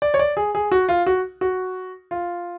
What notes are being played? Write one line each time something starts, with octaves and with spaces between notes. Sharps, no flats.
D5
C#5
D5
G#4
G#4
F#4
F4
F#4
F#4
F4